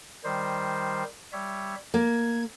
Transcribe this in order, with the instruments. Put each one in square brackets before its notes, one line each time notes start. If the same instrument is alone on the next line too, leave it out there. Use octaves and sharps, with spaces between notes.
[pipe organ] D#3 G3 C5
G3 C#5 E5
[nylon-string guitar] A#3 [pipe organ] G#6